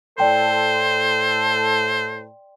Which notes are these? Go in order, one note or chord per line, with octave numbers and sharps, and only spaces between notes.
A2 A4 C5 D5 G5 C6